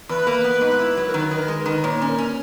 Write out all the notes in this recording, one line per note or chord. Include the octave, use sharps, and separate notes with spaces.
E2 B4
A#3
B3
G#2
E4
F#3
A#4
D#3 B4
D#3
A#4
G#3
B4
D#3
A#2 C#5
C#4
A#4
C#4